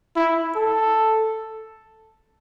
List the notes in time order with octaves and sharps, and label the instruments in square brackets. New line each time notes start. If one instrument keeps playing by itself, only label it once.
[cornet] E4
A4